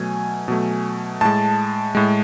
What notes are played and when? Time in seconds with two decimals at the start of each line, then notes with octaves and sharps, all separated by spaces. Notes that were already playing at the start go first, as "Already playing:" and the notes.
Already playing: B2 F#3 A3 G#5
0.48 B2 F#3 A3
1.21 A2 G#3 A5
1.95 A2 G#3